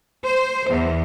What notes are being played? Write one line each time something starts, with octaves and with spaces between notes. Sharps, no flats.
C5
E2